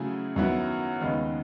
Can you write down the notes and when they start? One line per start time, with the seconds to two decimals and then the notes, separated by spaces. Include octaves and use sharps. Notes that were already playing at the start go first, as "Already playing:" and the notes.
Already playing: C#3 F#3 A3 E4 G#4
0.36 F#2 D#3 F#3 B3 E4
1.01 D#2 C#3 G#3 B3 D#4